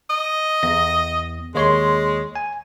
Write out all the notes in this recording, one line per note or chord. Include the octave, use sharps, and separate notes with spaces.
D#5
E2 A#6
D#2 G#3 C#5 C6
G#5